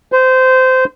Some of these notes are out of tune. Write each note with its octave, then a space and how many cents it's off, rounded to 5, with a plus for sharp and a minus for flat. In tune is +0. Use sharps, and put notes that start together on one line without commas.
C5 -20